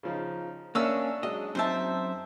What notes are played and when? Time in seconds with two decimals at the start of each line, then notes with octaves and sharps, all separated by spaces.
0.03 C#3 F3 D#4
0.75 A#3 C#4 D4 D5 E5 C#6 E6
1.23 F#3 G#3 D#5
1.55 F#2 C4 D#4 C5 E5 A5